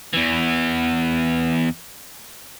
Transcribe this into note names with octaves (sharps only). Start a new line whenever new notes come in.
E2 E3